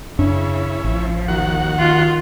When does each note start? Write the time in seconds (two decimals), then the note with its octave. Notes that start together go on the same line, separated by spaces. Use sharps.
0.19 F#2 C#3 C#4 D4 E4
0.84 A1 F3
1.28 D#2 F#4 F#5
1.76 D#3 F4